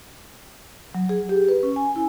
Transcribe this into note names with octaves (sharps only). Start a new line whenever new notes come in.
F#3
G#4
G4
B4
C#4
G#5
E4